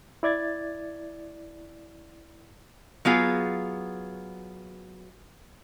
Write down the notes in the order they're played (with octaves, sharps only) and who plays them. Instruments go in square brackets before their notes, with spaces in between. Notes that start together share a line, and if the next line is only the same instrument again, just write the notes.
[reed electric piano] E4 D5 G#6 A6
[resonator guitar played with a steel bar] F#3 B3 F4 G#4